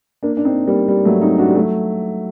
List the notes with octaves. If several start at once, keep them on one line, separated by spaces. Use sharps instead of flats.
A#3 D4
D4
C4 D#4
G3 A#3
G3
F#3 A3
C4 D#4
D4 F#4
G3
F#3 A3